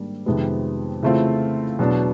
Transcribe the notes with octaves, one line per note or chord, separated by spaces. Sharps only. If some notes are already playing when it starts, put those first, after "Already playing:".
Already playing: G#2 D#3 G3 A#3 D4
F2 C3 D#3 G#3 B3
C#3 E3 A3 C4 F4
E2 B2 F#3 B3 D4